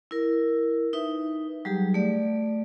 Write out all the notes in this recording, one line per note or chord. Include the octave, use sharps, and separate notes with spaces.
E4 A#4
D#4 B4 E5
F#3 G3 G4 G#4
A3 D5